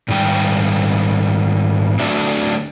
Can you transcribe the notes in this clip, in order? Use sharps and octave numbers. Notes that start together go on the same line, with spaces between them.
G#2 D#3 G3 G5
D3 F#3 A3 D4 G4 E5